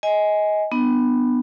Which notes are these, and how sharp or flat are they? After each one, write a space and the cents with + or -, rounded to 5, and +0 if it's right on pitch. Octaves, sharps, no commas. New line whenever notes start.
D#5 +20 G#5 +0
B3 +0 D4 +30